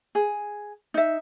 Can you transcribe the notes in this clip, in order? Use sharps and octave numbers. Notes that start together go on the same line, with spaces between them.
G#4
D#4 E5